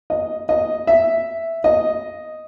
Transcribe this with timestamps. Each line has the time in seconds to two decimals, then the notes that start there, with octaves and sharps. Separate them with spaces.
0.10 D#5
0.49 D#5
0.87 E5
1.64 D#5